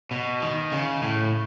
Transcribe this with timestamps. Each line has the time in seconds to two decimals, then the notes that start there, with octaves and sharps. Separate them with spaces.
0.11 B2
0.42 D#3
0.72 C#3
1.03 A2